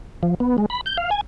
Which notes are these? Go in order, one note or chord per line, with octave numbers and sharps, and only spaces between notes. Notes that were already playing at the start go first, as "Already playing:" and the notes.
F3
B3
G#3
B5
G6
F5
G#5